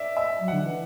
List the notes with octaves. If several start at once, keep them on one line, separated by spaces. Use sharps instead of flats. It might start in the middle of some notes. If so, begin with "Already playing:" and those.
Already playing: D5 E5
E5
F#3
F#5
D3
E3